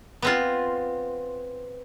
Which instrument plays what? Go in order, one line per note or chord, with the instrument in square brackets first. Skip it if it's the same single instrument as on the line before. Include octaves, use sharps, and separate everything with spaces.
[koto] B3 C4 F4